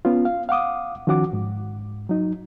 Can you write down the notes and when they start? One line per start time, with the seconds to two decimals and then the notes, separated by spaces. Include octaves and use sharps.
0.05 B3 C#4 F4
0.25 F5
0.49 F5 F#5 D6 D#6
1.07 D#3 F3 C#4 F#4 F#5 D6
1.33 G#2
2.09 F#3 D#4